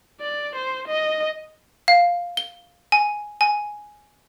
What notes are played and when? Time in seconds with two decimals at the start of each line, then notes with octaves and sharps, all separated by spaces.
0.21 D5
0.55 C5
0.88 D#5
1.88 F5
2.37 G7
2.92 G#5
3.41 G#5